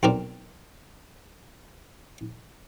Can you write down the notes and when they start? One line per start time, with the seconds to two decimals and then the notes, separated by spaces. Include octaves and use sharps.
0.03 B1 C4 A#4 D5